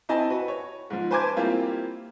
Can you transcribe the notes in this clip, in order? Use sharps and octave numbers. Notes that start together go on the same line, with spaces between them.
C4 E4 D#5 G#5 A5
F#4 B4
C#5
G#2 F3
B4 C5 G#5 A5 D6 G#6
G3 A#3 C4 E4 F4 G4